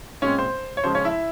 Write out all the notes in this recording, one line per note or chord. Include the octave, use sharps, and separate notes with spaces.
A#2 G#3 C4 C#4 C#5
C5
C#5
F2 C#3 F3 G#3 C5
C#4 C#5
E4 E5